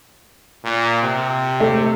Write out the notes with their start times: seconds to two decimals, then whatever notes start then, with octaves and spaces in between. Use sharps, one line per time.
0.64 A#2
1.02 C3
1.60 A3